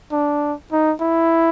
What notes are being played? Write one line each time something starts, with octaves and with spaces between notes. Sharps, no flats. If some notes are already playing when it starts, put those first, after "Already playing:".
D4
D#4
E4